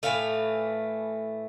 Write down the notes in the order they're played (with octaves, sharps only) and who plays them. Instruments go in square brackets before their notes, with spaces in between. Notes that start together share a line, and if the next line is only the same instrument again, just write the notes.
[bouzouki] A2 E3 A3 F5